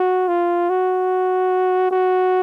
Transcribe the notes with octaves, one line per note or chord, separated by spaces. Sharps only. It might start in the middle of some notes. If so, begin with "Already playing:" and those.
Already playing: F#4
F4
F#4
F#4